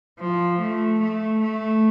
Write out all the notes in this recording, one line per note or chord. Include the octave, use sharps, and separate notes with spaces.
F3
A3
A3
A3